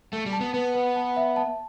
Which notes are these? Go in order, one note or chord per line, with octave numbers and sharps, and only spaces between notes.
A3 A5
G3
A5
B3
B3 B4
B4
A5
E5
A5